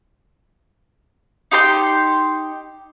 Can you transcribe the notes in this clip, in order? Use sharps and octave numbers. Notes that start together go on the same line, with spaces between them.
D#4 G4 C6 G6